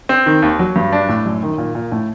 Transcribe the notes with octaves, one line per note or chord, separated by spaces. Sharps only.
C4
D#3
D#2
F#3
G2
D4
A2
F#2
D#3
A#2
A#2
A2